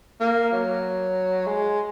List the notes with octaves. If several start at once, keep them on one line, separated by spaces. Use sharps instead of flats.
A#3
F#3
G#3